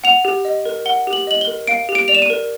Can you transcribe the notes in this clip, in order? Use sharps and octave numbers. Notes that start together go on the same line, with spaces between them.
F#5 F7
G4
D#5
A#4
F#5 G7
G4
F#7
D#5 F#7
G7
A#4
F5 D7
G4
D7
D5 F7
E7
D#7
A#4